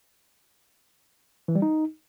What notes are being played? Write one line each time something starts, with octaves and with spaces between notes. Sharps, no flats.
E3
G3
D#4